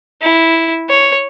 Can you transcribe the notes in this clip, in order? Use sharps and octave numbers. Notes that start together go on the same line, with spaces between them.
E4
C#5